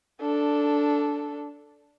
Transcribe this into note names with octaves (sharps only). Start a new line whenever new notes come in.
D4 A4